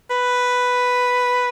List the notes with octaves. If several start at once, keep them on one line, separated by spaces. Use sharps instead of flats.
B4